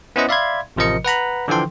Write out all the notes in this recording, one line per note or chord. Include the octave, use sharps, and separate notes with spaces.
B3 C#4 E4 C5 D#5 F#5
D5 E5 F5 B5 C6 G#6
A1 C3 F3 A#4 D#5 C#7
B4 F#5 A#5 B5
D3 E3 F3 A4 G5 C6